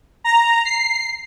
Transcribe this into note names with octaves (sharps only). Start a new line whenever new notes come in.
A#5
C7